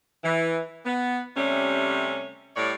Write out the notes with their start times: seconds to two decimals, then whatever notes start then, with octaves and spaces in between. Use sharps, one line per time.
0.24 E3
0.86 B3
1.37 C3 G3 A3 C#4
2.56 A2 G3 C#5 D5